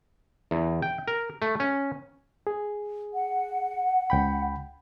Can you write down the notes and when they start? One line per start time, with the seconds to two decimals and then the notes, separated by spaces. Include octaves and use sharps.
0.51 E2
0.82 G5
1.08 A#4
1.42 A3
1.60 C#4
2.47 G#4
3.13 F#5
4.10 C#2 G5 B5